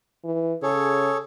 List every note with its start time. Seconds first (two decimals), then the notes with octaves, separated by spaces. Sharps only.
0.25 E3
0.63 C#3 G#4 A4 C#5